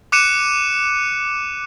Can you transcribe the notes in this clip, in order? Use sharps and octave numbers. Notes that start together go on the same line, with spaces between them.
D6 F#6 C#7 D#7 E7